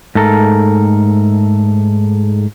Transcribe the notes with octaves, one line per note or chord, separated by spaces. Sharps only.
G#2 A3 A4 A#4